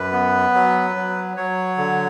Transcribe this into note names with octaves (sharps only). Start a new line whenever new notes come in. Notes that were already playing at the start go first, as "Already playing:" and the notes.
Already playing: F#2 B4
B3
F#3
F#3
F#3 C#5
D3